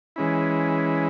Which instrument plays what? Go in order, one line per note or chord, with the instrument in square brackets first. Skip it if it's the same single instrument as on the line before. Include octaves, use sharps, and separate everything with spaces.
[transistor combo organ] E3 G#3 C#4 E4